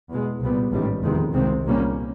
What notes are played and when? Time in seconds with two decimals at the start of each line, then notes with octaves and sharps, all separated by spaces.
0.10 E2 B2 G#3
0.41 C2 A#2 G3 B3
0.72 A1 G#2 D#3 G3
1.03 F1 E2 C3 D#3 G#3
1.33 C2 C3 D#3 G#3 C4
1.64 C2 A#2 G3 A#3 C#4